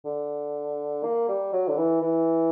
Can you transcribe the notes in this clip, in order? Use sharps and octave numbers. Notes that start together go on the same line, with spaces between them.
D3
A#3
G3
F#3
D3
E3
E3